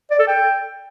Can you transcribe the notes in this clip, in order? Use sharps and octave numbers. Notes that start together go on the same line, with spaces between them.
D5
A4
G5